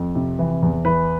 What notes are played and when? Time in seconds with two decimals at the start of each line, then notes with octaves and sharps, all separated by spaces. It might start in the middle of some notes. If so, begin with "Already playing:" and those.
Already playing: F2
0.15 C3
0.39 E3
0.63 E2
0.85 E3 B4